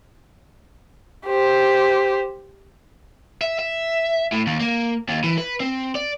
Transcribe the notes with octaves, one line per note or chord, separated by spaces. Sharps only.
G4 C5
E5
E5
A2
D#2
A#3
D#2
E3
B4
C4
D5